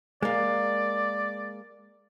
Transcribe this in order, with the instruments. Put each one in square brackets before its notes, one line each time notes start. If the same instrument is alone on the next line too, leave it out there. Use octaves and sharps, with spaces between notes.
[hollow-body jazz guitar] G#3 A#3 [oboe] D5